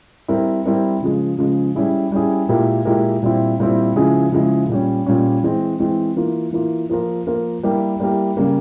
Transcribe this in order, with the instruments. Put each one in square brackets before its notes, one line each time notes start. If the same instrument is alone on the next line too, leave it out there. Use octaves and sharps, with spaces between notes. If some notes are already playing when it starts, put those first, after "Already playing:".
[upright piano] G3 C4 E4 A#4
G3 C4 E4 A#4
C#3 F3 G#3
C#3 F3 G#3
G3 C#4 E4 G#4
G3 C#4 E4 G#4
A#2 G#3 E4 G4 A#4
A#2 G#3 E4 G4 A#4
A#2 G3 C4 E4
A#2 G3 C4 E4
C#3 F3 G#3 E4 G#4
C#3 F3 G#3 E4 G#4
A#2 G3 C#4
A#2 G3 C#4
E3 G#3 C4
E3 G#3 C4
E3 A#3 F4
E3 A#3 F4
F3 A#3 F4 A#4
F3 A#3 F4 A#4
G3 A#3 E4 G4 A#4
G3 A#3 E4 G4 A#4
C#3 G3 A#3